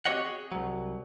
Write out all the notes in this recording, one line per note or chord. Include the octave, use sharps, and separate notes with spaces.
C4 F#4 G4 C#5 D#5 F#5
G#4
C2 F#3